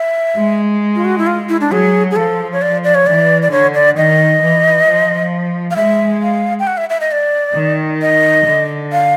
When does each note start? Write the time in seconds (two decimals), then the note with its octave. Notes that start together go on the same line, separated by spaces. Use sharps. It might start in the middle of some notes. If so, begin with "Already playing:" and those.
Already playing: E5
0.37 G#3
0.95 F4
1.05 F#4
1.18 E4
1.27 F4
1.49 E4
1.61 D4
1.72 F#3 G#4
2.11 G#4
2.16 F3 A4
2.53 C#5
2.62 D5
2.84 D5
2.95 C#5
3.07 E3 D5
3.42 D5
3.51 D3 C#5
3.74 D5
3.97 D#3 D#5
4.42 E3
4.87 F3
5.71 F5
5.76 G#3 E5
6.22 F5
6.60 G5
6.67 F#5
6.77 E5
6.90 E5
7.01 D#5
7.12 D5
7.56 D#3
8.02 D#5
8.47 D3
8.92 F5